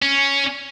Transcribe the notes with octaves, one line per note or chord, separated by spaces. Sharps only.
C#4